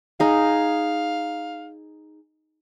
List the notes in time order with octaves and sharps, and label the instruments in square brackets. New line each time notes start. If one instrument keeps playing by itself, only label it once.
[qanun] D#4 G#4 [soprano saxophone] F5